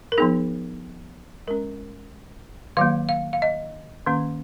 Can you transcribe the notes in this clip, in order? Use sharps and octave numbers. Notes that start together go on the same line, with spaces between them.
A#4
F3 B3 D#4 G#4
G#3 C#4 A#4
D#3 F#3 A#3 F5
F5
F5
D#5
D#3 A#3 C#4